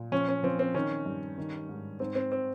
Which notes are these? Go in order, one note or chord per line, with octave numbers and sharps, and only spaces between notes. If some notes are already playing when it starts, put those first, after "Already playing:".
Already playing: A#2
F3 C#4
C#4
F3 C4
C4
D#3 C#4
G2
D#3
G#2
G#2 C4
C4
C4